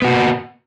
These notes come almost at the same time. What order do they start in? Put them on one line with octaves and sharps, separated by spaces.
B3 F#4 A#3